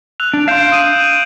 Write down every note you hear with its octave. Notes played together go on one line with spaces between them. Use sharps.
E6 F#6 F7
D4
F5 C6 G6 D7 E7
D#6 D#7